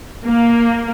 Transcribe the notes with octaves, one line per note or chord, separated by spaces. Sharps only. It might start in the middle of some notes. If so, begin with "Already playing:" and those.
A#3